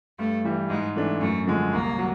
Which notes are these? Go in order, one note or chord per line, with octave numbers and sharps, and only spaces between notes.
G2 A3
E3 G3
G#2 G#3
E3 A3 D4
F#2 A3
D3 F3 G#3
C2 A#3
F#3